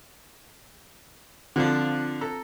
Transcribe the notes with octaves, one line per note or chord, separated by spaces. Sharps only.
D3 F3 C4 D4 F4
A4 A#5